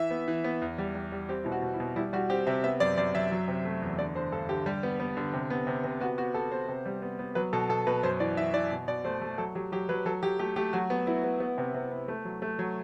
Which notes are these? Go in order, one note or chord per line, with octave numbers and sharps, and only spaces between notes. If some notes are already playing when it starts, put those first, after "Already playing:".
Already playing: E3 E5
B3
E3
B3
E2
G3
G3
G3
C4 G4
B2 E4
F#4
B2
E4
B2
G3 E4
G3 F#4
C4 G4
C3 E5
B3 E5
F#2 D5
F#2 D5
F#2 E5
F#3
C3
A3
E2
D3 D5
D3 C5
G2 A4
D3 G4
G3
B3
B3
D3
C3
B3
C3
C3
B3 F#4
B3 F#4
B3 A4
B3 C5
C3
G3
B3
B3
F#3 B4
B2 A4
B2 A4
B2 B4
F#2 C5
E3 D5
E3 E5
E3 D5
B2
B2 D5
A3 C5
A3
F#3 A4
F#3 G4
F#3 G4
F#3 B4
F#3 A4
F#3 G4
A3 G4
A3 G4
F#3 F#4
B3
B3 E4
B3
B3
C3
C3
B3
A3
F#3
A3
F#3